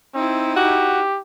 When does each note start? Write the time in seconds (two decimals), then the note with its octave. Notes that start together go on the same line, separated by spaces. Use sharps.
0.14 C4 D#4 E4
0.57 F#4 G4